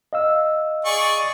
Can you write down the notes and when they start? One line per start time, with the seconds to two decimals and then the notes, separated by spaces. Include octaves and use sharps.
0.13 D#5 F5 E6
0.85 G#4 D5 C#6